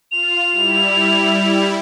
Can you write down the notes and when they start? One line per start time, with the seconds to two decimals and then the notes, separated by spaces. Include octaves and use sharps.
0.11 F4 F7
0.51 G3 E4